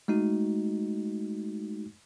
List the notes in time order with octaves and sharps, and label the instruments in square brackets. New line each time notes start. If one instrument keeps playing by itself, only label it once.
[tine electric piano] G#3 A3 D#4 F#4